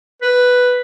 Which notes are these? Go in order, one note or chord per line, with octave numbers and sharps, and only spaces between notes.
B4